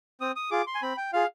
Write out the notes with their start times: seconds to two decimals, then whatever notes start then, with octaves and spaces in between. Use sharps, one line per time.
0.21 C4 D#6
0.36 D#6
0.51 F4 G#4 D6
0.67 C6
0.75 G#5
0.82 C4 B5
0.97 G5
1.13 F4 G#4 F5